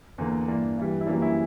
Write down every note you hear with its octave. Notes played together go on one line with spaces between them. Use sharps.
E2 D3 A#3
G2 E3 A#3 D4
G2 E3 G3
E4
F#2 E3 G3 A#3 D4
C#4 E4